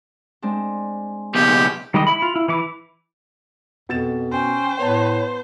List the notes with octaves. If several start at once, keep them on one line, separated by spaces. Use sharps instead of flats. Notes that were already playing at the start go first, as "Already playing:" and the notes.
G#3 C4 D4
C#2 B2 G4 G#4 F5
D#3 G3 G#3 G4 D#5
E4 B5
F4
E4
E3 E4 D6
F2 B2 A6 E7
C#4 C5 G5
A2 B3 C#5 A5